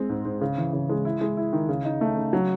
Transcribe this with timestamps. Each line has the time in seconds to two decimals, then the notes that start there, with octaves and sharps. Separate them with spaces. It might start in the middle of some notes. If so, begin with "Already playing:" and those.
Already playing: G#3 C4
0.09 G#2
0.25 G#2
0.41 C#3
0.58 E3
0.73 C#3
0.90 G#3
1.05 E4
1.21 G#3
1.37 E4
1.53 D#3
1.69 C#3
1.85 D#4
2.01 A3
2.17 C#3
2.33 F#3